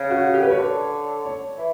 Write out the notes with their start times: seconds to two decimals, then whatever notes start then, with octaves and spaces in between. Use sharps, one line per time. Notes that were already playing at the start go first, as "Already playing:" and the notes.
Already playing: C#3
0.10 F#4
0.27 F#4
0.34 G4
0.43 B4
0.50 C#5
0.59 D3
1.25 C#5
1.58 E3